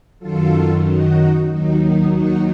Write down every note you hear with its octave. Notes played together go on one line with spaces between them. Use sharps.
F#2 D#3 F#3 F4 A4
D#4 F#4
D#2 D#3 F#3 D#4
D#4
D#4 F#4